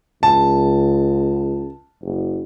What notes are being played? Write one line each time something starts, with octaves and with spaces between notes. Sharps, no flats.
C#2 A5
F#1